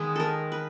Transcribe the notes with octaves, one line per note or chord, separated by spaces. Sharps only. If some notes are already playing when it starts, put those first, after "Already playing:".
Already playing: D#3 G#3 B3
A4 A#4
B4